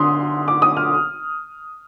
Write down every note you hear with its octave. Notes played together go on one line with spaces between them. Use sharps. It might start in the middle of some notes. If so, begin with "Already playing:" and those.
Already playing: D3 C6 D#6
D6
D#6
F6